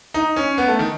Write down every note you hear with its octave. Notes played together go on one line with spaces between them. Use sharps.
D#4
C#4
B3
A3
D#3